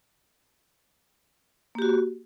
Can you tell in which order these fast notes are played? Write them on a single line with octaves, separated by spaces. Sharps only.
A#3 G4 F#4